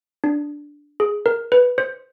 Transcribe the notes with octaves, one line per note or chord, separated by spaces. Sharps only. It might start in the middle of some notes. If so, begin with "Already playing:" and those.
D4
G#4
A#4
B4
C5